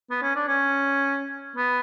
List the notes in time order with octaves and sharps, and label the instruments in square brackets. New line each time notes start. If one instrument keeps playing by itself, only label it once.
[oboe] B3
C#4
D4
C#4
B3